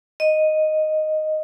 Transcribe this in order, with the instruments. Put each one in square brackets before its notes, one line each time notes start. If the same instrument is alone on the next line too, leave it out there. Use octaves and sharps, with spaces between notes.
[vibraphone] D#5